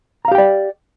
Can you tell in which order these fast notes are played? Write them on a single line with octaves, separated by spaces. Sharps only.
A#5 F5 G4 G5 D5